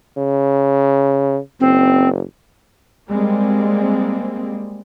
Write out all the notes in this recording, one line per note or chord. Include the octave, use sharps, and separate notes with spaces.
C#3
F#1 C4
G3 G#3 A#3 C4